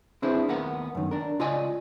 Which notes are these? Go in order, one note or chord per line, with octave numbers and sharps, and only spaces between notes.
C4 D4 E4 G#4 B4 C5
D#2 B3 A#4 F#5
F#2 D#3
D4 A#4
C#2 F4 D5 D#5 G#5